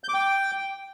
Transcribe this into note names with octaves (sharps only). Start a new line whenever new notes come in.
G6
D6
G5